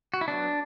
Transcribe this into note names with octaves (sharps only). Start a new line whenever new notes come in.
F#4
E4
F#3 B3 D4